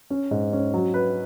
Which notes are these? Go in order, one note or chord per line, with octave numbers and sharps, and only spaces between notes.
C#4
G#2
C#4
F#3
B4